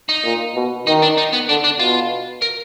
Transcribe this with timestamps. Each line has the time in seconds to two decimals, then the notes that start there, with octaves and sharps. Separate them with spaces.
0.09 D#4
0.24 A#2
0.55 B2
0.87 D#3 D#4
1.02 D4
1.18 D#4
1.33 B3
1.49 D3 D4
1.64 D4
1.79 B2 F4
2.42 A#4